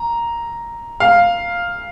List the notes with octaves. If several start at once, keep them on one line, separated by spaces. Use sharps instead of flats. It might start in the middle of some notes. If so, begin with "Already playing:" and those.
Already playing: A#5
F5